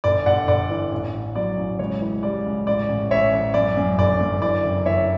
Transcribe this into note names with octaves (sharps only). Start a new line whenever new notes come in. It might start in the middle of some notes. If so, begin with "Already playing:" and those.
G1 D5
G1 D5 F#5
G1 D5 F#5
E3
A1
A1
F#3 D5
A1
C#2 C#5
E3
G3 D5
C#2
A1 D5
A1
A1 C#5 E5
A1
F#2 D5
F#2
G1 D5
F#2
E3 D5
F#1
E3 C#5 E5